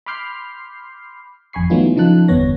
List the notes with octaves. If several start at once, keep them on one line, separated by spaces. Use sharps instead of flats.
B5 C6 D6 F6 G6 C7
G#1 F2 G#5 B5 C#6 C7
E3 F#3 A3 B3 D#4 F4
C#3 F3 D#4 F4 A5 F#6
G1 E2 G2 B3 C#5 A#6